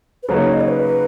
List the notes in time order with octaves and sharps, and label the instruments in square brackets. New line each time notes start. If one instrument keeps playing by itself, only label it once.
[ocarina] B4
[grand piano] C#3 F#3 A#3 D#4 [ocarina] C#5
[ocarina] D#5
C#5
B4